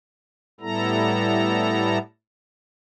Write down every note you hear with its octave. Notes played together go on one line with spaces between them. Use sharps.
A2 G3 B3 E4 A4 A#5